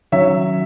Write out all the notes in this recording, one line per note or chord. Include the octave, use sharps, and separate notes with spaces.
D#3 F#3 C#4 C#5 E5